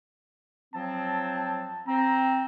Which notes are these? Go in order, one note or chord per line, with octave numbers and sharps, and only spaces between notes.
F3 F#3 C4 A5
C4 A#5